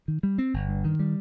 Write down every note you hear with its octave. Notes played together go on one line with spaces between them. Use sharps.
D#3
G3
C4
G1
G2
D#3
G3